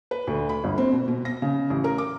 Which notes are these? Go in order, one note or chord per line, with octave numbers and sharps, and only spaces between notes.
B4
D2
B5
G1
C4
B2
B2
A#6
C#3
A1
A#4
D6